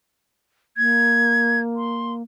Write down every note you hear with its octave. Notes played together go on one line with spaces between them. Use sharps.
A#3 G#6
C6